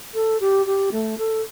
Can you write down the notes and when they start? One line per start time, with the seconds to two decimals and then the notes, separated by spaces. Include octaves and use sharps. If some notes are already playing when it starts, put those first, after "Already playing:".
0.14 A4
0.40 G4
0.66 G4
0.91 A3
1.18 A4